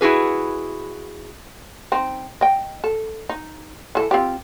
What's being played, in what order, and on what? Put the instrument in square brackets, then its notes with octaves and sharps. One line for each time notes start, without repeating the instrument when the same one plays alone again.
[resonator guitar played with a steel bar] E4 F#4 G#4 B4
[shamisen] C4 D#4
D#5 G5
A4
D#4
E3 A4
C4 F4 G4